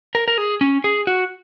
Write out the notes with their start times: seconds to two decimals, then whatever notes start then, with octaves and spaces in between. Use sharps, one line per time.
0.15 A#4
0.28 A#4
0.38 G#4
0.61 C#4
0.84 G#4
1.07 F#4